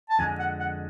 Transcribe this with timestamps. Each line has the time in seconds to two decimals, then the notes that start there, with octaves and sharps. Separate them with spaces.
0.10 A5
0.19 F2 D3 G#3 G#5
0.39 F#5
0.60 F#5